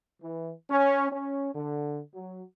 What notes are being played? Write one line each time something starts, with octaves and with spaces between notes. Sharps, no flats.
E3
C#4
C#4
D3
F#3